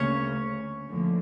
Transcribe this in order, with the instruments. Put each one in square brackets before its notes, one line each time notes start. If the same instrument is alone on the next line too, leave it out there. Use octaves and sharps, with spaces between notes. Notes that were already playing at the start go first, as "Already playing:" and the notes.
Already playing: [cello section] D2 C#3 A#3 [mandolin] C#4 C#5
[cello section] D2 D3 F3 A#3